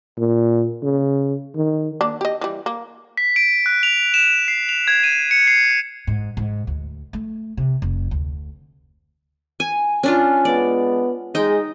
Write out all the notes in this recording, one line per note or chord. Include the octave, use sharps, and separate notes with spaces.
A#2
C#3
D#3
A#3 D4
G4 D#5
E3 G3
A#3
B6
D7
F#6
F7
E7
C7
F7
G#6
D#7
C#7
C7
G#2
G#2
D2
A3
C3
F1
D2
G#5
C#4 D4 F4
G#3 B3 D5
G#3 D#4 G5